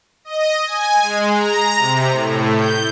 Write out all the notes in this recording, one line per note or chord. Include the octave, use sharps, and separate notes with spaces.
D#5
G#5
G#3
A#5
C3
A2
G6